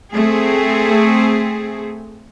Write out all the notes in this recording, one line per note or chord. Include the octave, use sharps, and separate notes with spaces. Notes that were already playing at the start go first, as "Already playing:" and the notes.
A3 C4 G#4